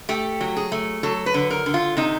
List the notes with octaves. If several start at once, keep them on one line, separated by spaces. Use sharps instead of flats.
A3 G4
F#3
G#4
A3
F#3 A4
B4
D3
A#4
D3
F4
C3 D#4